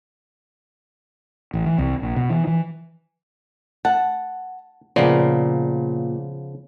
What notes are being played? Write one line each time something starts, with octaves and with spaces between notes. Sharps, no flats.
A1
E3
C2
A#1
B2
E3
E3
F#5 A5
A#2 C#3 F3 B3 D5